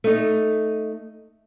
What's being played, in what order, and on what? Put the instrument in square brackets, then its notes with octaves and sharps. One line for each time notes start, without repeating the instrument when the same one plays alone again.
[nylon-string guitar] A3 D#4